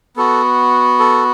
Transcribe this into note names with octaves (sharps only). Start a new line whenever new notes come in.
B3 F#4 A4
A4